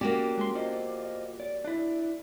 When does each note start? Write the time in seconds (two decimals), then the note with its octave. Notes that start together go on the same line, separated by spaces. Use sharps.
0.01 A#3 C#4 F#4 G4 D5
0.38 G#3 C6
0.55 F4 C5 D5 D#5
1.40 D5
1.64 D4 E4 D5